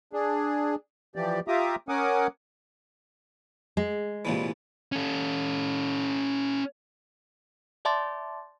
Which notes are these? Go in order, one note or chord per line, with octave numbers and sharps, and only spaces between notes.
D4 G#4
E3 F3 G4 D5
F4 G4 E5 A#5 D6 D#6
C#4 A#4 F#5 G#5 D6 D#6
G#3
C2 A#2 E3
C#4 A4
D5 E5 A5 C6 D6 A6